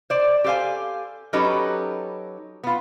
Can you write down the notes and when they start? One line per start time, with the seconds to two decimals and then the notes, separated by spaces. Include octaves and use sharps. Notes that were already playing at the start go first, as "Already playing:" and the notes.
0.10 C5 D5
0.44 G4 A4 C5 F5 G#5
1.33 F#3 C#4 D#4 G4 A4 B4
2.64 B3 F4